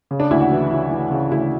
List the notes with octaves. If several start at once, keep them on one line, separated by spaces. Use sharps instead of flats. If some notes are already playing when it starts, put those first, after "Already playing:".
C#3
D4
D2 E4
F#4
E3
E3
E3
C#3
D2 E4